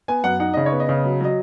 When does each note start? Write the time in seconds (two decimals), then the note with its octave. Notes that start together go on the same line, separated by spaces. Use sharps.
0.08 B3 G#5
0.24 F#2 F#5
0.40 D#4 F#5
0.54 C#3 D#5
0.66 C#5
0.72 B3
0.80 D#5
0.89 C#3
1.04 F#3
1.21 F#3 D#5